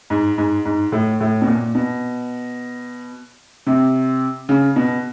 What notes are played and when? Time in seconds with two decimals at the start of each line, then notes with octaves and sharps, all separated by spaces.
0.10 G#2
0.38 G#2
0.65 G#2
0.92 A2
1.21 A2
1.42 B2
1.47 A#2
1.75 B2
3.66 C3
4.49 C#3
4.76 B2